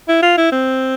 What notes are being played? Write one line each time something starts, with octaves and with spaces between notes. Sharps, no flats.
E4
F4
E4
C4